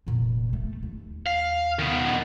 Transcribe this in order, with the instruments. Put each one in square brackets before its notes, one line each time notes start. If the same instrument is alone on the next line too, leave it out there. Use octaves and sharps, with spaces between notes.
[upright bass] F1 A#2
A3
D#2
[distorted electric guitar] F5
D#3 B3